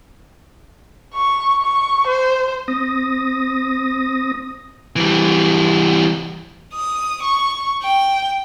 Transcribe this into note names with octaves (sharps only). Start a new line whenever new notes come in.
C#6
C#6
C5
C4 D#6 A#6
E3 G3
D#6
C#6
G5